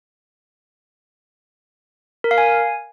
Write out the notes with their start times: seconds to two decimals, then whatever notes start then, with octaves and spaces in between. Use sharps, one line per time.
2.24 A#4
2.31 F5
2.38 G#5